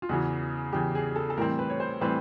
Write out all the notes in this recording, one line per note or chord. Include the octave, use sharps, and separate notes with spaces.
F4
E2 C#3 E3 F#4
E2 C#3 E3 G4
G#4
A4
A4
A2 E3 G3 C4 A#4
B4
C#5
C5
A2 E3 G3 C4 B4